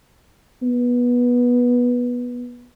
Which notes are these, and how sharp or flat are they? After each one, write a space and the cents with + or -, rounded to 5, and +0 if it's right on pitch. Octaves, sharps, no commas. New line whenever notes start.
B3 -15